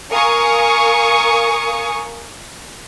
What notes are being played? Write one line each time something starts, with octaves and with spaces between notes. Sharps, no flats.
A#4 F5 G#5 C#6 D#6